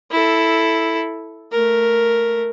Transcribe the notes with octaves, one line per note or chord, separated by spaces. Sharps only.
E4 A4
A3 A#4